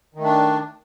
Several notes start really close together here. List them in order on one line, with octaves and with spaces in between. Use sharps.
D#3 A3 D4